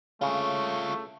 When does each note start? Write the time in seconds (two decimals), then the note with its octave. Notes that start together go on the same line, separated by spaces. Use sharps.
0.21 C#3 A3 F4 C#5